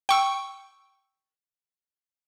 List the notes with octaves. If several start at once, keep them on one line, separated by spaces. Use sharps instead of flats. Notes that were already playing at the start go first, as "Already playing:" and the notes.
G5 C#6 E6